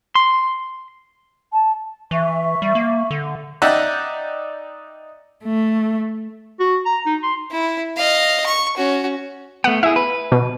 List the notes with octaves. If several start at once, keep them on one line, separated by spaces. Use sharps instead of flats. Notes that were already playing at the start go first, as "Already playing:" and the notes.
C6
A5
E3 E5 C#6
G3
A#3
D3
D#4 D5 E5 F#5 G5
A3
F#4
A#5
D#4
C6
E4
D#5 F5
C#6
C#4 F#4
A3 B3 F#5
E4 G#4 E5
B4
B2